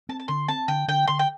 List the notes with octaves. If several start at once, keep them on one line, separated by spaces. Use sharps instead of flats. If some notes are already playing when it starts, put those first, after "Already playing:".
C4 A5
A5
D3 C6
C4 A5
D3 G5
D3 G5
D3 C6
G5